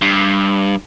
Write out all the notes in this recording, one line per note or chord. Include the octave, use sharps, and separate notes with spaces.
G2